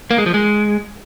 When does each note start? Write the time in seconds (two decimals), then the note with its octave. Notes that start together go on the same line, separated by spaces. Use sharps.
0.11 A#3
0.18 G#3
0.26 F3
0.34 G#3